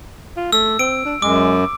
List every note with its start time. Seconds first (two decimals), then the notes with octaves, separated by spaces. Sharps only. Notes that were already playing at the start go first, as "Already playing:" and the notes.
0.37 F4
0.52 A3 E6
0.79 C4 D7
1.05 D4
1.22 F#2 G#3 D6